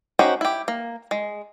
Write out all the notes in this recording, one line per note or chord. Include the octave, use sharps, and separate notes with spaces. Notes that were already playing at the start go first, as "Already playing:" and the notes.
C#4 D#4 F#4 G4 C5
E4 G4
A#3
G#3